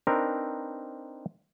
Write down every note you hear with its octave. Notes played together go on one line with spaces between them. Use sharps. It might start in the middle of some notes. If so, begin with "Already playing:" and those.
C4 D4 D#4 A#4 B4